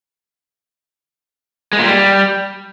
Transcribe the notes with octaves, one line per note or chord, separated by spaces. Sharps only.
G#3
A#2
G3